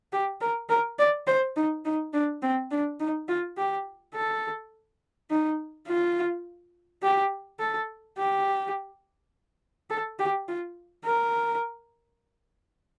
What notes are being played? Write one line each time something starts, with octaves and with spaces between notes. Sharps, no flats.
G4
A#4
A#4
D5
C5
D#4
D#4
D4
C4
D4
D#4
F4
G4
A4
D#4
F4
G4
A4
G4
A4
G4
F4
A#4